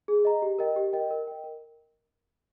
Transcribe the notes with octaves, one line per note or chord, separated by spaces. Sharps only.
G#4
D#5 A#5
G4
A#4 D#5 G5
G4
A#4 D#5 G5
A#4
D#5 G5
A#4